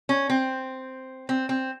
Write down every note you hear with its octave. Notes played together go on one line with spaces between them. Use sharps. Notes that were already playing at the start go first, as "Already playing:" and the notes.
C#4
C4
C4
C4